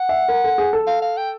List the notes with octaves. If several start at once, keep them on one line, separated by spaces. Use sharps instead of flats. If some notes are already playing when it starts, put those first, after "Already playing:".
Already playing: F#5
E5
A#4
A4
G#4
A4
F5
F5
G5